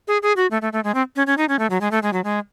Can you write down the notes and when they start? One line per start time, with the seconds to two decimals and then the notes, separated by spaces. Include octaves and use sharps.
0.08 G#4
0.23 G#4
0.37 F#4
0.51 A3
0.62 A3
0.73 A3
0.84 G#3
0.94 C4
1.16 C#4
1.27 C#4
1.38 D#4
1.49 C#4
1.59 A3
1.70 F#3
1.81 G#3
1.91 A3
2.03 G#3
2.13 F#3
2.24 G#3